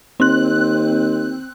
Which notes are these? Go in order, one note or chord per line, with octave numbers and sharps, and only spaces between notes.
D#2 C4 F#6